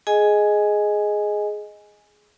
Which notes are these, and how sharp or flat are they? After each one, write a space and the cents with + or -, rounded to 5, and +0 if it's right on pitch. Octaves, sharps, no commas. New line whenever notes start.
G#4 +10 D#5 +0 G#5 +0